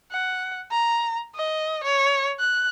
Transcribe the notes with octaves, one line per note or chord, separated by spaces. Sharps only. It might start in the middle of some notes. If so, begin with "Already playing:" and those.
F#5
A#5
D#5
C#5
F#6